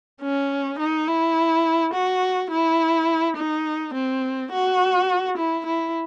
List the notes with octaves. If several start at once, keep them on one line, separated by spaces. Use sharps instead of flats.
C#4
D#4
E4
F#4
E4
D#4
C4
F#4
E4
E4